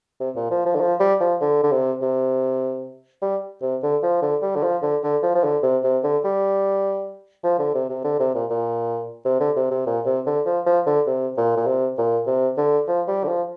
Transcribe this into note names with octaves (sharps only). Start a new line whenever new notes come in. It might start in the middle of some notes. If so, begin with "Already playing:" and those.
C3
A#2
F3
F3
D3
F3
G3
F3
D3
D3
C3
C3
G3
C3
D3
F3
D3
G3
D3
F3
D3
D3
F3
F3
D3
C3
C3
D3
G3
F3
D3
C3
C3
D3
C3
A#2
A#2
C3
D3
C3
C3
A#2
C3
D3
F3
F3
D3
C3
A#2
A#2
C3
A#2
C3
D3
F3
G3
D3
F3